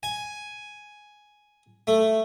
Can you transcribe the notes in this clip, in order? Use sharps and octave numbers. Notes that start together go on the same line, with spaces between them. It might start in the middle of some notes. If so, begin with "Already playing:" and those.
G#5
A3